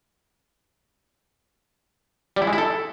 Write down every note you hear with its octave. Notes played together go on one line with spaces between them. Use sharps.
G3
E4
G#3
E4
A4